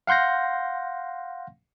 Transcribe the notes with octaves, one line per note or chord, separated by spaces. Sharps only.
F5 F#5 C6 G6 A#6